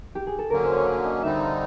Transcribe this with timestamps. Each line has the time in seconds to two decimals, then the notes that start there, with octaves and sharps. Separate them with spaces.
0.15 G4
0.27 G#4
0.39 A4
0.50 D3 F#3 A#3 C#4 A#4
0.65 C5
0.76 C#5
0.86 D5
1.05 D#5
1.23 D3 G3 C4 D#4 E5
1.41 F5